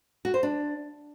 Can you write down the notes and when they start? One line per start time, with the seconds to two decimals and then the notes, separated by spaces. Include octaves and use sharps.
0.25 F#4
0.34 C5
0.43 D4